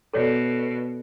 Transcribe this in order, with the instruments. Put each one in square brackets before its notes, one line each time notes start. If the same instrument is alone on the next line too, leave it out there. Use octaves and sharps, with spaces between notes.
[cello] B2 [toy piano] A4 C#5 D5